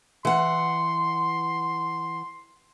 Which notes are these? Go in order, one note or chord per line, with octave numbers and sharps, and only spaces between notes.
E3 F#5 C6